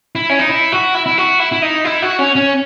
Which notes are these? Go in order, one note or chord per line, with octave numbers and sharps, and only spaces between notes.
E4
C#4
D#4
E4
F#4
E4
E4
F#4
E4
E4
D#4
E4
F#4
C#4
C#4